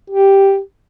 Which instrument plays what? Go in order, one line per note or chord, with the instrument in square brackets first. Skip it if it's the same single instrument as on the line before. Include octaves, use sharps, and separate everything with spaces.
[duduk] G4